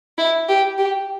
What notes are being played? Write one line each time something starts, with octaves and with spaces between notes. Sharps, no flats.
E4
G4
G4